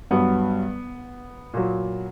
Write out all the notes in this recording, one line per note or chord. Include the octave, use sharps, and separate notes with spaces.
G2 F#3 B3
A#2 F#3